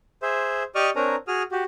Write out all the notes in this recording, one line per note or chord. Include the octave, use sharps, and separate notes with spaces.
G#4 C5 E5
G4 D5 D#5 C#6 D#6 F6
C4 D4 A#4 C#5 G#5 A#5
F#4 G#4 D#6 F6
F#4 G4